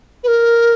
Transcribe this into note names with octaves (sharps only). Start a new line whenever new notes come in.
B4
A#4